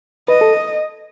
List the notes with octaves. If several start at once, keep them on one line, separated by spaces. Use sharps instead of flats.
B4 D#5
A4